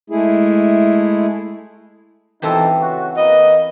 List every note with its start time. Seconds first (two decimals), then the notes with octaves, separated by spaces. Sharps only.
0.10 G#3 A3 E4 G#4
2.42 B2 E3 C4 D#4 G4 A4
2.81 C#3 F#4
3.17 E2 A#3 B4 D#5